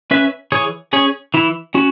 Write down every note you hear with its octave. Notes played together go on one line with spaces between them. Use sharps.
C#4 B4 E5
E3 G#4 C#5
C#4 G#4 C#5
E3 E4
C#4 F#4